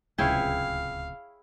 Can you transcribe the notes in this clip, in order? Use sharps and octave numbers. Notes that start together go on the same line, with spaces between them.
D1 C#2 C3 E4 G#4 C#5 F5 G5